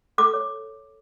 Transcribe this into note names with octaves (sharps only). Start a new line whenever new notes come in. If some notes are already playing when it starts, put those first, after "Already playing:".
A4 D6
C#5